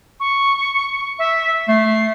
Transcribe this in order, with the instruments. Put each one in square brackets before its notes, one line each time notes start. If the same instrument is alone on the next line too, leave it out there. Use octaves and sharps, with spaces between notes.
[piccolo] C#6
E5
[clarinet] A3 [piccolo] C7